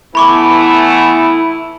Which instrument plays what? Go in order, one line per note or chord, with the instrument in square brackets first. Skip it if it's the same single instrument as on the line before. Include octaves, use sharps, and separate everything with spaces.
[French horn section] E3 A3 B3 [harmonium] E4 [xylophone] B5 C#6 D6